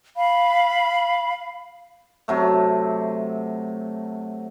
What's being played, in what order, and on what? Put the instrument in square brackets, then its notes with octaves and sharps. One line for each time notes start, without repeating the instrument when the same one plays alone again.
[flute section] F5 B5
[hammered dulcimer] C3 F#3 A3